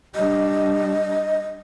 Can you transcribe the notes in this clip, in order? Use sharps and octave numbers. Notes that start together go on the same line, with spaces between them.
G3 D4 D#5